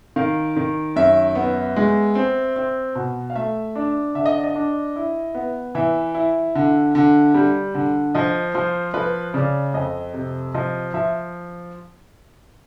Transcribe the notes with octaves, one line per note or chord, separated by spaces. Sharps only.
D#3 F5
D#3
F#2 E5
B3
G#3
C4
C4
B2
F5
A3 E5
D4
D3 E5
D#5
D5
D#5
D4
E4
B3
E3 E5
E4
D3
D3
G3
D3
F3 D#5
F3 C5
F3 B4
C#3 D5
F2 D#5
C3
F3 D#5
F3 E5